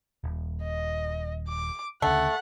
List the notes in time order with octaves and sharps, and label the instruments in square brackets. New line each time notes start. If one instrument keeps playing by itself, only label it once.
[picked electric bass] D#1
[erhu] D#5
D6
[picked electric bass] D2 C#3 [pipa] A3 [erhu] F#5